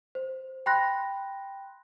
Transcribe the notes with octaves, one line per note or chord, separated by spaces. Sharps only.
C5
G5 B5 C6 F#6 A#6